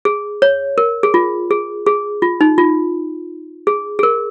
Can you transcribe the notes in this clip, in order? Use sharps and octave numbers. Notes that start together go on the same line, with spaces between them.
G#4
C#5
A#4
G#4
F4
G#4
G#4
F4
D#4
F4
G#4
G#4
A#4